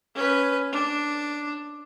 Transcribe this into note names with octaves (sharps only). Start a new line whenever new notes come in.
C#4 B4
D4